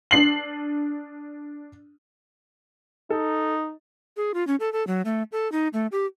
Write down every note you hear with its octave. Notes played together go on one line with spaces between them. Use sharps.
D4 C7 F#7
D#4 A4
G#4
F4
C#4
A4
A4
F#3
A3
A4
D#4
A3
G4